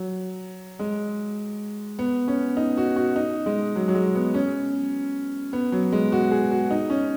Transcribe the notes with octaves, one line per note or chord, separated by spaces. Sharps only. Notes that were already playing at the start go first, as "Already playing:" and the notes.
Already playing: F#3
G#3
B3
C#4
D#4
F#4
F#4
D#4
G#3
F#3
F#3
G#3
B3
C#4
B3
F#3
G#3
F#4
G#4
F#4
D#4
C#4